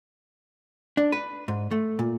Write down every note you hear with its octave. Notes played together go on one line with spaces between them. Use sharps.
D4
B4
G#2
A3
A#2